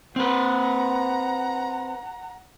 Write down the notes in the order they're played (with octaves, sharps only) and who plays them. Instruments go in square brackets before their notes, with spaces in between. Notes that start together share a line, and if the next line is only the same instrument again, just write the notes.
[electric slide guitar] C4 B4 [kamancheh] F#5 A#5